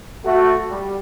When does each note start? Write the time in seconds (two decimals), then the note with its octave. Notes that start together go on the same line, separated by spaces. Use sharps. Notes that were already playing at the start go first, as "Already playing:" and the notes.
0.25 A3 F#4
0.70 G3